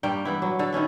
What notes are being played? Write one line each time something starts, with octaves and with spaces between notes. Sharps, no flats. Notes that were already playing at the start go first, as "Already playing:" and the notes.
G2 G3 A#3 G5
E3 B3 E4
F#3
D3 A4
D#3 B3 C#4 E4